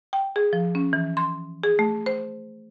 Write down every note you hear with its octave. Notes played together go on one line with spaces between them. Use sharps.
G5
G#4
F3
C#4
E3
C6
G#4
A3
C5